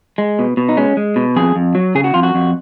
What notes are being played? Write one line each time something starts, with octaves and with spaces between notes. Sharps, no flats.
G#3
B2
B2
D#4
G#3 C#4
G#3
B2
F2 G#4
F2
F#3
C#3 G#4
F#4
F2 F4
F#4
F2